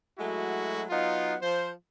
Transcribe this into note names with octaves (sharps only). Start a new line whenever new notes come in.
F#3 G#3 A3 E4 F#4
F#3 B3 D#4 F4
F3 C5